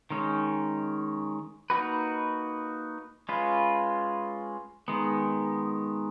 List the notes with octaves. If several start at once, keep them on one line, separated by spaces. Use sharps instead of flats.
D#3 G#3 C#4
A#3 D#4 F#4 B4
G#3 C#4 F4 B4
D#3 G#3 B3